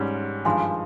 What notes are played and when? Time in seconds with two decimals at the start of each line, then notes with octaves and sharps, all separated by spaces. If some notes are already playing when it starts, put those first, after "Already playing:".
Already playing: G#2 G3 C#4
0.45 G#1 G2 F3 G#3 G#5 C6